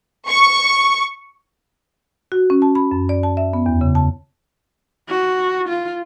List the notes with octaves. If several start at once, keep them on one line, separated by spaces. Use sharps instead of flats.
C#6
F#4
C#4
A5
B5
F#2
D5
A5
E5
B3
E2
C#3
A5
F#4
F4